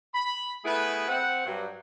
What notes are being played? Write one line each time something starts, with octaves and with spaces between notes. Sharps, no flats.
B5
A3 B3 E4 G#4 B4
C4 F#5
G2 F#3